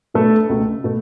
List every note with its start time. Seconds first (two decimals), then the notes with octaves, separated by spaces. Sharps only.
0.14 B2 F#3 A3 B3 D4 A4
0.49 C#2 B2 A3
0.84 B2 A3